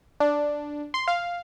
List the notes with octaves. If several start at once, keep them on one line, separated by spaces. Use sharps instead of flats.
D4
C6
F5